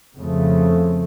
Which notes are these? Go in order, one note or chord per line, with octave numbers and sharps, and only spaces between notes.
F2 C#3 F3 A3